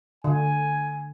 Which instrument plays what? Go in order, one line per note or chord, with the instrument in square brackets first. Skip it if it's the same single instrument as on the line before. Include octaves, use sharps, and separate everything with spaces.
[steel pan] D3 [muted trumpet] G#5